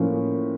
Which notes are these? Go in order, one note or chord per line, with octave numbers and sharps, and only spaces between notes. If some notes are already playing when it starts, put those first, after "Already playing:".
Already playing: A2 F3 A#3 C#4